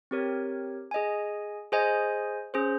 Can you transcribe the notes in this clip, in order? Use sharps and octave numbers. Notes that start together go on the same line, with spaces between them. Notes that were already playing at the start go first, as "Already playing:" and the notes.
C4 G4 A#4 C#5
G#4 D#5 G#5
G#4 C5 D#5 G#5
C#4 G#4 C5